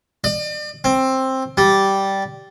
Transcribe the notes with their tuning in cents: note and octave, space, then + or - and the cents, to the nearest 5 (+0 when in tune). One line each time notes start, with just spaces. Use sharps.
D5 +40
C4 +10
G3 -10